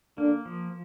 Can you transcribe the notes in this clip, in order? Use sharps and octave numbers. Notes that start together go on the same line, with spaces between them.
D3 A#3 D4
F3